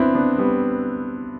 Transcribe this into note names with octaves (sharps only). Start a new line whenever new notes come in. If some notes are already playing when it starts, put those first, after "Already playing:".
Already playing: B3 C4 D4 E4
B3 D4
G3 B3